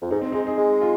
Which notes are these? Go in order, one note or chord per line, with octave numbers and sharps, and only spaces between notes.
F2
G#2 D#4
C4
G#3 D#4
G#4
G#3
F4